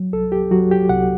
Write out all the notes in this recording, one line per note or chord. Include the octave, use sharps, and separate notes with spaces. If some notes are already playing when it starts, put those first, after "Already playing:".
Already playing: F#3
C2 A4
G4
F#3 F#4
G4
C2 F#5